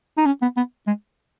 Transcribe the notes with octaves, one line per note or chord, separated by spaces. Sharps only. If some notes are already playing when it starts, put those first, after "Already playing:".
D#4
C#4
B3
B3
G#3